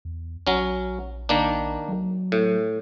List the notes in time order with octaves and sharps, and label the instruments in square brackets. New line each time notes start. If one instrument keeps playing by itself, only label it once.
[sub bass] E2
[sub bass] A#1 [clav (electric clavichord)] F#3 C#4
[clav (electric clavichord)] D#3 A#3 D4
[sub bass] F#3
[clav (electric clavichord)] A2